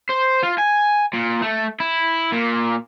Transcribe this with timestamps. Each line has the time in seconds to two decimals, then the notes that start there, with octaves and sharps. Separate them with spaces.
0.10 C5
0.43 F4
0.58 G#5
1.13 A#2
1.42 A3
1.80 E4
2.32 A#2